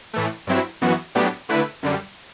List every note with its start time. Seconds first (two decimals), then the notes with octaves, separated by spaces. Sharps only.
0.14 A2 E3 A3
0.47 G2 F#3 C4 E4
0.81 F#2 E3 B3 F#4
1.15 A2 F#3 B3 D4 G4
1.49 D3 A3 E4 B4
1.83 F#2 D3 G3